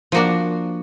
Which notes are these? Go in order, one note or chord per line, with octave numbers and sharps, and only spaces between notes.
F3 A#3 D4 F#4